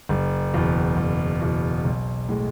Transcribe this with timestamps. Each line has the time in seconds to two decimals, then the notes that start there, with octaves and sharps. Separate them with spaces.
0.09 F#1
0.54 E2 B2
0.97 F#1
1.41 E2 B2
1.85 B1
2.29 A2 G#3